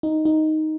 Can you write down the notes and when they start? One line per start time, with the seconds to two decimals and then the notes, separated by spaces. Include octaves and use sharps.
0.03 D#4
0.25 D#4